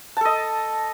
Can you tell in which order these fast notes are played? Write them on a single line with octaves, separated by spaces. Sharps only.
A5 A4 D#5